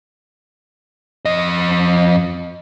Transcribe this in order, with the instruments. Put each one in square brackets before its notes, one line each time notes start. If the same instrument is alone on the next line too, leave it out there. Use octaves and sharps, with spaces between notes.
[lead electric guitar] F2 D#5